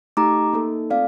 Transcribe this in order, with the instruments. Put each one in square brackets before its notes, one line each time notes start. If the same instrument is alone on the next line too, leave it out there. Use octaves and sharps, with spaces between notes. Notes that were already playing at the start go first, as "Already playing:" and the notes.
[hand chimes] A3 D#4 G4 A#5 D6
A#3 D#4 A4
A3 C4 F4 A4 D5 F5